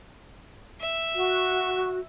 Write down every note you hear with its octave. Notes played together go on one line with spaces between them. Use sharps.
E5
F#4